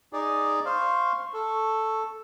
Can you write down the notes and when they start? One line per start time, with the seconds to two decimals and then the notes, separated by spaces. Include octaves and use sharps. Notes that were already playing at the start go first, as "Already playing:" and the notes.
0.13 D#4 G#4 D5
0.66 C5 F5 C#6
1.34 A4